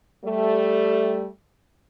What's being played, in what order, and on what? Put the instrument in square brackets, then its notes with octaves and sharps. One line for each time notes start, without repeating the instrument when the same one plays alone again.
[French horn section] G3 A3